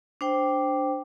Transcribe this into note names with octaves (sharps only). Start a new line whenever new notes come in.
D4 C5 G5